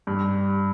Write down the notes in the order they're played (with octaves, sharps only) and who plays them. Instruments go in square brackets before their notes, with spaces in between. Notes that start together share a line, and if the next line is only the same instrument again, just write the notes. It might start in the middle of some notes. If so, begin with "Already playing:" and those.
[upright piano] G2